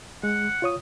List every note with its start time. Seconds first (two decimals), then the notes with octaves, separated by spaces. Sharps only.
0.23 G#3 F#5
0.62 F4 C#5 D#6